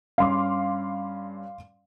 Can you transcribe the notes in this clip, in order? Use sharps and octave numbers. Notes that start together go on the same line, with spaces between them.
G2 C#4 F5 C6 D6